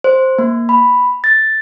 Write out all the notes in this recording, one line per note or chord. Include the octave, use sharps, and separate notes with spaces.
C5
A#3
B5
A6